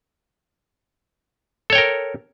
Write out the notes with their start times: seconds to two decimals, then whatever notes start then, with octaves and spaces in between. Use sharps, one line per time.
1.70 A4
1.73 C#5
1.75 G5
1.78 A#4